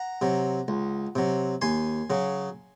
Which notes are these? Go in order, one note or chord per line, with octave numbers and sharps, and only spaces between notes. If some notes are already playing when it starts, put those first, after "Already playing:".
Already playing: F#5 A#5
C3 F#3
C#2
C3 F#3
D#2 G#5 C6
C#3 F#3